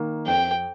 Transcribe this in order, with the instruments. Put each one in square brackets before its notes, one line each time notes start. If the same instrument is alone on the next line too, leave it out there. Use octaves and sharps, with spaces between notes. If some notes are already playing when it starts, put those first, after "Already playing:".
Already playing: [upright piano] D#3 A#3
[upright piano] F2 [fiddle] G5